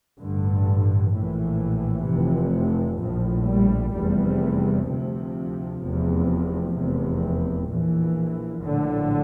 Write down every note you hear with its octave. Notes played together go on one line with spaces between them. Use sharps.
A1 G2 D3
A#1 A2 E3
F1 F2 C3
A#1 A2 F3
G3
F1 E2 C3 G3
D2 C3 F3
F1 E2 C3
F1 E2 C3
A#1 A#2 E3
A#1 A2 D3